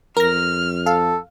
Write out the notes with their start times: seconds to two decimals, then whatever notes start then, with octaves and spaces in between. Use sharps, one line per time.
0.17 F2 A#4 F6 A#6
0.86 A4 F5